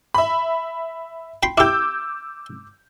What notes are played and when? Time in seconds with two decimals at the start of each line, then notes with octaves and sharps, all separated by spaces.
0.14 E5 B5
1.43 G5 B5 C6
1.58 E4 G4 D6 E6 G6